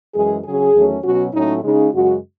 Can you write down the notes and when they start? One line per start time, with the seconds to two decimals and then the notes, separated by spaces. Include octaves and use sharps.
0.14 F#2 E3 G#3 G#4
0.45 C#3 F#3 C#4 G#4
0.74 E2 D#3 F#3 A3 C#4
1.04 B2 F#3 C#4 F#4
1.33 A2 F#3 A3 C#4 D#4
1.64 C#3 G#3 D#4
1.93 F#2 C#3 G#3 F#4